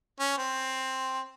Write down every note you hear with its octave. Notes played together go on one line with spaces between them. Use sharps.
C#4
C4